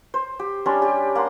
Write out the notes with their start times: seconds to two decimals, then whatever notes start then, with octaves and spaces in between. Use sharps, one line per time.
0.14 C5
0.39 G4
0.66 G3 C#4 D4 C6
0.82 G4
1.15 A#3 F#5 C6